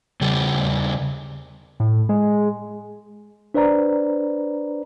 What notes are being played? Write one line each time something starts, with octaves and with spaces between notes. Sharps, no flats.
C#3 G3 G#4
A2
G#3
D4 B4 C5 D5 A#5